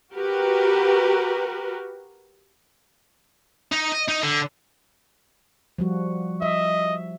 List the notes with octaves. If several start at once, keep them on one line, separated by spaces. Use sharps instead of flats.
F#4 G4 A#4 B4
D#4
D#5
D#4
D3
F3 G3 F#4
D#5 E5